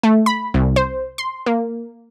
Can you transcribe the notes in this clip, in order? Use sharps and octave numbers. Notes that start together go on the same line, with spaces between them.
A3
B5
C2
C5
C6
A#3